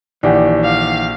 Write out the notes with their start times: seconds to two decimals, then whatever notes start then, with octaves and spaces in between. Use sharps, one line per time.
0.23 A#1 D#3 E3 G4 D5 F#5 G#5
0.64 F5 F7